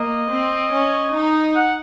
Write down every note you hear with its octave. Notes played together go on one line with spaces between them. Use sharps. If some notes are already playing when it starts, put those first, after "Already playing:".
Already playing: A#3 D#5
C4
C#4
D#4
F#5